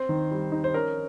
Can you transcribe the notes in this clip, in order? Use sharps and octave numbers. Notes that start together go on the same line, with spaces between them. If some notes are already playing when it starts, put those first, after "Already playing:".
Already playing: C4 C5
D#3
G3
D#4
C5
C#4 A#4